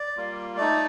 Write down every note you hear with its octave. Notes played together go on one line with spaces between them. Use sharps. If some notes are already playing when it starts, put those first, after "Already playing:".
Already playing: D5
G3 A#3 F4
A3 D#4 D5